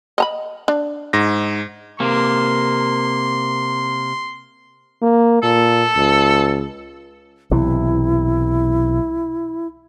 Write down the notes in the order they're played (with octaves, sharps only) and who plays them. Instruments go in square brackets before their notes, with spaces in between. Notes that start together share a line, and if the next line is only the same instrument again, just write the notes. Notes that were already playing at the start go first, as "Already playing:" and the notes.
[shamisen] D#5 A#5 B5
D4
[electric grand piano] G#2 A#6
[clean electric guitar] C3 A#3 [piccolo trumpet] C6
[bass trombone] A#3
[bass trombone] A#2 [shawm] A4
[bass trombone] C#2
[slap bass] B1 C3 E3 [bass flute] E4